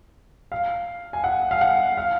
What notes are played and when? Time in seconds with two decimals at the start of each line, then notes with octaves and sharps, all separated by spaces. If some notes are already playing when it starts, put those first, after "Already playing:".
0.52 F5
1.13 G#5
1.24 F#5
1.51 F5
1.61 F#5
1.97 F5